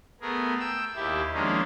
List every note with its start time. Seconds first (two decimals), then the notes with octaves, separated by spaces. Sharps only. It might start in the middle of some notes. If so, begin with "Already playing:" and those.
0.21 A3 B3 G#4 A#4
0.60 G5 E6
0.95 D#2 E4 G4
1.33 D#3 F3 G#3 A#3 C#4 D4